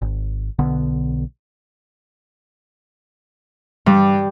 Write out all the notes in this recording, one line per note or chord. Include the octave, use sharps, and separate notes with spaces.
G#1
B1 D3 B3
G2 G3